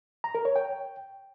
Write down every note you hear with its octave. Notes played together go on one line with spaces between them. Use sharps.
A#5
A#4
C#5
G5